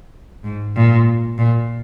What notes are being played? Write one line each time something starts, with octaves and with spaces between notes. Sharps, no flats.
G#2
A#2
A#2